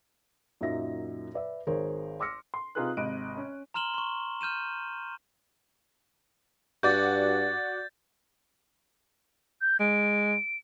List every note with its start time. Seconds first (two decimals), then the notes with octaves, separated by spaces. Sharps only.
0.61 F#2 A#2 F#3 D#4 E5 A#6
1.34 B4 D5 E5
1.67 G#1 G#4 A#4 C5 C#5
2.20 C6 D6 E6 F6 A#6 C#7
2.54 C6
2.75 C3 D#4 F4 G#4 B4 F#6
2.97 G#1 C3 D#5 F#6 D7 D#7
3.37 C#4
3.74 A#5 C6 F6 E7 F#7 G7
3.94 C6 C#6
4.41 F6 G6 D#7 E7
6.83 G2 F#4 D5 G6 A6
9.61 G6
9.80 G#3 D7